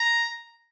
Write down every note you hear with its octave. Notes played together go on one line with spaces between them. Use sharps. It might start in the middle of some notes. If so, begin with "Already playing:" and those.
Already playing: A#5